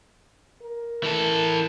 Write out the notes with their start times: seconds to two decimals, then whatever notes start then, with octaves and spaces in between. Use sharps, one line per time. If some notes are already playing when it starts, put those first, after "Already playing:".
0.62 A#4
1.03 E3 A4